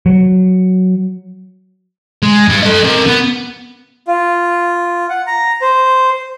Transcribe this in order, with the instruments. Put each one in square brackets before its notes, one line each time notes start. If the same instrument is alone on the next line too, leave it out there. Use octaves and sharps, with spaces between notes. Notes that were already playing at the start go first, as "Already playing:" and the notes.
[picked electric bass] F#3
[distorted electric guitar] G#3
G2 G3
A4 D#5
C4 A#4
B3
[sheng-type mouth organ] F4
F#5
A#5
C5